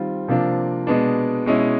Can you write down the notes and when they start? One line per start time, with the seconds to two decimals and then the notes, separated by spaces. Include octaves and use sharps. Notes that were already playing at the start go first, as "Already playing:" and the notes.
Already playing: D#3 G3 C4 F4
0.28 C3 F3 A#3 D4 F4
0.87 B2 G#3 B3 D4
1.46 B2 G#3 C#4 E4